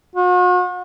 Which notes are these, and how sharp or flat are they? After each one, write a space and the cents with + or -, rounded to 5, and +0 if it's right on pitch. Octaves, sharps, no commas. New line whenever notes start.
F#4 -45